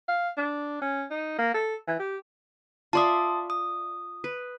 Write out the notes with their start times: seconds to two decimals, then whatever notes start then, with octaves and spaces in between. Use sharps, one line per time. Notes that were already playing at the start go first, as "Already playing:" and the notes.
0.08 F5
0.37 D4
0.81 C#4
1.10 D#4
1.38 A#3
1.54 A4
1.88 E3
1.99 G4
2.93 F4 D5 E5 A5 C6 D#6
3.50 D#6
4.24 B4